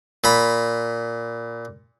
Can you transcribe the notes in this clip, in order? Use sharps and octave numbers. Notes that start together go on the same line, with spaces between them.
A#2 A#5 B5